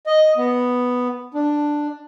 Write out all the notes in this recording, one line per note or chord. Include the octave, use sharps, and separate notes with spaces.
D#5
B3
D4